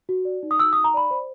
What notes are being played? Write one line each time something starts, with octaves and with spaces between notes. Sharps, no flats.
F#4
D5
D#4
D#6
F#4 E6
D#6
D#4
A#5
D5 B5
C5